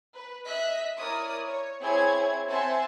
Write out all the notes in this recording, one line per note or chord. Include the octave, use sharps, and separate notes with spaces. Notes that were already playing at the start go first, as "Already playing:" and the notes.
B4
D#5 E5 F#6 B6
E4 A#4 C#5 D5 D#6
C#5
C4 E4 G#4 C#5 G#6
C4 C5 E5 F#5 G#5 A5